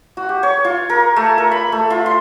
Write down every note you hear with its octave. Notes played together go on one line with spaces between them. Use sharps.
F#4
G4
C#5
F4
A#4
A3
A#4
B5
A3
F4
C6